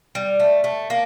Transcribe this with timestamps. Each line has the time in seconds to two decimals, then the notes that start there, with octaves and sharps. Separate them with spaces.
0.15 G3
0.40 A3
0.64 A3
0.90 A#3